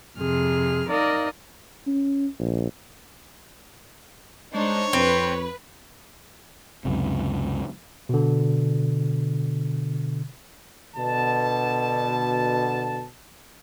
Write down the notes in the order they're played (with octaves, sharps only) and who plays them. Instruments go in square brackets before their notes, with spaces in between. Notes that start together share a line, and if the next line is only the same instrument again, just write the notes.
[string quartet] F2 C3 G#4 F6
D#4 A#4 D5 D#5 F5
[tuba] C#4
A#1
[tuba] G#3 [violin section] D4 D#4 C5 [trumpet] C#5
[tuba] F2 [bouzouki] C4 [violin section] B4
[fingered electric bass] C#2 F#2 C3
[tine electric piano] B2 D3
[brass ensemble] B2 D3 A5